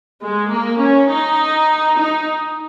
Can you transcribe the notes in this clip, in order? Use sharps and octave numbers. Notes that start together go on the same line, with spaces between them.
G#3
A#3
C#4
D#4
D#4